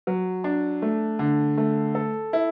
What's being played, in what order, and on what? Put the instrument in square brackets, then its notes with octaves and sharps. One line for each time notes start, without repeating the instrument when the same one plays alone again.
[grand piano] F#3
D4
A3
D3
A3
A4
E4